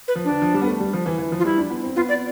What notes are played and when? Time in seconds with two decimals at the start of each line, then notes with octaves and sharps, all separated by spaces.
0.08 B4
0.15 F3
0.25 D3 D4
0.42 F3
0.54 G3
0.62 B3
0.67 A3
0.80 G3
0.93 F3
1.06 E3
1.18 E3
1.32 F3
1.39 F4
1.45 G3 E4
1.58 D4
1.70 B3
1.84 C4
1.96 B3 F4
2.09 D5